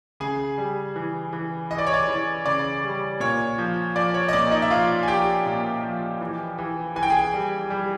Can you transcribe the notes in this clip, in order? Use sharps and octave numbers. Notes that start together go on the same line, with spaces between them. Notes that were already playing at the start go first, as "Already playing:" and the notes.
C#3 G#4 G#5
G3
E3
E3
E3 D#5
D5
C#5
D5
E3
C#3 D5
G3
A#2 C#5
F3
F3 D5
C#5
D#5
A#2 D5
D#4 D#5
E5
F3 F4 F5
G#5
F3 G4 G5
A#2
F3
E3
E3
E3 G#5
G5
G#4 G#5
G3
G3